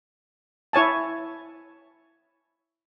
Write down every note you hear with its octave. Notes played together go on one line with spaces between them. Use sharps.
E4 C#5 G#5 A5